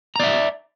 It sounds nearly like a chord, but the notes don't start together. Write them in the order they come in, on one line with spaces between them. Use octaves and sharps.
A#5 D5 E5